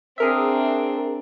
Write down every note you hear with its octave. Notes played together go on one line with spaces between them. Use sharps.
C4 D4 G#4 A#4 E5